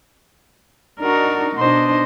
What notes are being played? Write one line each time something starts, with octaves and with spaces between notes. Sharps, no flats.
D4 D#4 F#4 A#4
B2 D4 D#4 C5 D#5